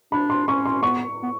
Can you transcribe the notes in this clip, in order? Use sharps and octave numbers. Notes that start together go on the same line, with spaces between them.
D4 B5
C6
C#4 C#6
C6
B3 C#6
B3